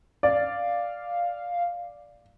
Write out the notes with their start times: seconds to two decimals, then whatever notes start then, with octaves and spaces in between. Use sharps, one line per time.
0.23 D5 F5